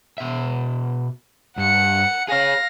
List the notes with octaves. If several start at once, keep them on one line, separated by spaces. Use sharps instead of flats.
B2 E5
G2 F#5 C#7
G#4 C#5 F5 A#6